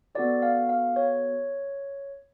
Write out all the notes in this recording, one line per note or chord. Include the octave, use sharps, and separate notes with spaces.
B3 F#4 A4 D5
F5
F5
C#5